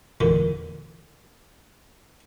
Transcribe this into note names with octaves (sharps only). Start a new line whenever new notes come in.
E2 A#2 D3